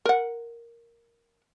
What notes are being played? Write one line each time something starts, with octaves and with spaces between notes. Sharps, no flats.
A#4 F#5